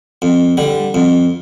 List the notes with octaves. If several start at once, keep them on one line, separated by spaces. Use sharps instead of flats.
F2
D3 G3
F2